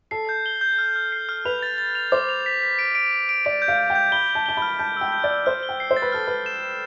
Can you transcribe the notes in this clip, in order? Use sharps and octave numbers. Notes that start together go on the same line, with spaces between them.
A4 C7
G6
G7
G6
F6
F6
C7
F6
B4 F7
A6
A6
F7
C5 D6
F7
B6
B6
D7
D7
D7
D7
D5 D7
G6
F5
G6
G5
G6
B5 G7
G7
A5
A5 G7
B5 F6
A5 G6
G5 E6
G6
D5
E6
C5 F6
G7
G5
C7
C5
A6
B4
A4 F6
B4 A6
E7
E7